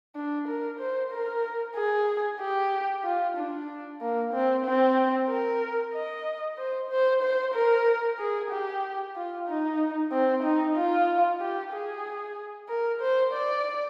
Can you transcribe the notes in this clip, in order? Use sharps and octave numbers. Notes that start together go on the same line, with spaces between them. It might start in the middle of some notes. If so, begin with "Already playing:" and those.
D4
A#4
C5
A#4
G#4
G4
F4
D4
A#3
C4
C4
A#4
D#5
C5
C5
C5
A#4
G#4
G4
F4
D#4
C4
D#4
F4
G4
G#4
A#4
C5
D5